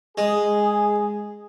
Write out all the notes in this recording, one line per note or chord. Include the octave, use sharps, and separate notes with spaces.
G#3 G#4